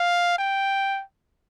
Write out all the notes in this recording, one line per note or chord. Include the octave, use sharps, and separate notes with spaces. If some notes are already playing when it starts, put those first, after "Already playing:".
Already playing: F5
G5